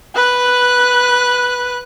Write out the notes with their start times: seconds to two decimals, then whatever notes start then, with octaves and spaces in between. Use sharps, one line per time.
0.16 B4 F#6